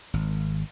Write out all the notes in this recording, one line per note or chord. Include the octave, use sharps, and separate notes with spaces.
G#1